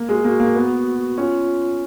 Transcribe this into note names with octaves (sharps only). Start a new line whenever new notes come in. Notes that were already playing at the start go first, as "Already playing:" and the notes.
Already playing: A#3
G#3 F#4
A#3 F#4
A#3
B3
C#4 F4